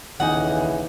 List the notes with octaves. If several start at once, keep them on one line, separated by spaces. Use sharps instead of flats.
D#1 C2 C#3 E3 D#4 F#5 G#5